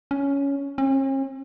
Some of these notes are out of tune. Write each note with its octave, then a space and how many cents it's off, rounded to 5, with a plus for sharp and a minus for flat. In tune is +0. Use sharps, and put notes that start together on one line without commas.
C#4 +10
C#4 -45